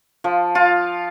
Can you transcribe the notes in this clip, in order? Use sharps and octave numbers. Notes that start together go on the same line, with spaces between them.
F3
F4